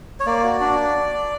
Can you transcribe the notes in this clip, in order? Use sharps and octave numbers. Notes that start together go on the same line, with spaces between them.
C#5
A#3 D5
F#4
D4